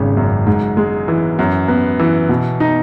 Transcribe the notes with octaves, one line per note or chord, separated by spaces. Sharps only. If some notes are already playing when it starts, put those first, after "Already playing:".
Already playing: G#1 C#3
F#2
G#2
G#3
E3
F#2
B3
E3
B2
D#4